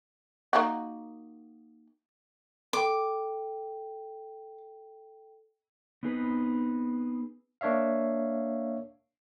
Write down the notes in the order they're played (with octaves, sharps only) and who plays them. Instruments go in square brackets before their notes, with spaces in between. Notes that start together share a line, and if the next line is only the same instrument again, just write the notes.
[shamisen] A#3 D#4 F#4
[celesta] A4 G5 [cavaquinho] D6
[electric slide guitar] B3 C4 D#4 G#4 B4
[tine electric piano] A#3 D4 C#5 E5 F5